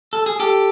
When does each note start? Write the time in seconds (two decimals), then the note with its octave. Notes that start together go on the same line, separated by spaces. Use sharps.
0.13 A4
0.26 G#4
0.40 G4 A4